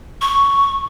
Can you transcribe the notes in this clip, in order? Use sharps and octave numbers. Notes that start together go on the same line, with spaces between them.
C#6